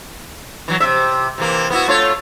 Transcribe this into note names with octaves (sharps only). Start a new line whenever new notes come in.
E3 F#3
C3 E5
C3 E3 A#3
B3 E4 F#4
A3 F4 C#5